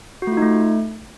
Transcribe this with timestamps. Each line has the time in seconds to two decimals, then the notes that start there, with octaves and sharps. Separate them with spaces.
0.22 F#4
0.27 A3
0.32 F4
0.37 D#4
0.42 A3